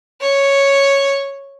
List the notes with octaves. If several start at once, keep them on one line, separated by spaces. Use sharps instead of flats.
C#5